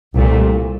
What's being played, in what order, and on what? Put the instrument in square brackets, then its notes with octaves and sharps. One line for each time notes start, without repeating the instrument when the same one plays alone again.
[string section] C2 A#2 A3